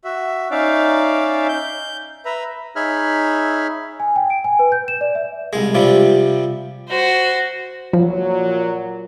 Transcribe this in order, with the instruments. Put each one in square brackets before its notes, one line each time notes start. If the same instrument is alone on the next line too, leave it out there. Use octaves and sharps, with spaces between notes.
[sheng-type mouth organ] F#4 E5
C#4 D#4 D5 E5 F5
G6
B4 E5 A#5
[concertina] D#4 G#4 C#5 E5 B5 F6
[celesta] G#5
G5
D7
G#5
B4
G6
E7
D5
E5
[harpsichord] C2 G#3
C3 F3 G3
[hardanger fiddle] F#4 C5
[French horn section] A#2 F#3 [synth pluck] F3